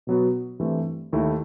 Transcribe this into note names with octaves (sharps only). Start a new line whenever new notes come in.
B2 F#3 B3 F#4
G2 E3 A3 C4
D#2 D#3 A3 E4